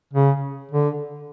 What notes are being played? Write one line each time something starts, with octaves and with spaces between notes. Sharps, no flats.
C#3
D3